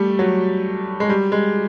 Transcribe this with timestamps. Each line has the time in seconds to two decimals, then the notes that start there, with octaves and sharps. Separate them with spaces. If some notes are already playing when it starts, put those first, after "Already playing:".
Already playing: G3 A3
0.19 F#3
1.00 G#3
1.09 G3
1.32 G#3